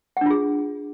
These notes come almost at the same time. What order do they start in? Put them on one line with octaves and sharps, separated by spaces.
F#5 D4 F4 G#4